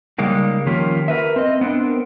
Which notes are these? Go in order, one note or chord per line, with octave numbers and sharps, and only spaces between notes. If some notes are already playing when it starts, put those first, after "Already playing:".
C#3 G3 G#3 A#3 D#4
D#3 F3 A#3 C#4 G4
A#4 B4 E5
C4 D#5
B3 C4 D4 A#4